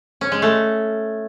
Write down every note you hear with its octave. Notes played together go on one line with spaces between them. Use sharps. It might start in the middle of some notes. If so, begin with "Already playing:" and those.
C#4
G#3
A3